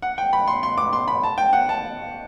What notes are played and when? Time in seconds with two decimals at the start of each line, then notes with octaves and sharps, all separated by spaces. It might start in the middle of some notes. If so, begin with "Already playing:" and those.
0.02 F#5
0.18 G5
0.33 B5
0.48 C6
0.63 C6
0.78 D6
0.93 C6
1.08 B5
1.24 A5
1.38 G5
1.53 F#5
1.69 A5